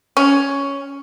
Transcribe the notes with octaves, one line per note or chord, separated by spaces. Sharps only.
C#4